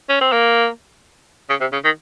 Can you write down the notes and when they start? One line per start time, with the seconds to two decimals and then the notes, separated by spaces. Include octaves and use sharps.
0.09 C#4
0.21 C4
0.32 A#3
1.49 C#3
1.61 C3
1.72 C#3
1.84 D#3